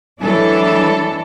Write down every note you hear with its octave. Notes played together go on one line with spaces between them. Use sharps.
E3 F#3 G#3 D4 A4